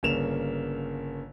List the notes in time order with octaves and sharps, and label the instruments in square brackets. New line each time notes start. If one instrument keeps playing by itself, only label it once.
[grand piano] G1 C#3 A#3 E7 F7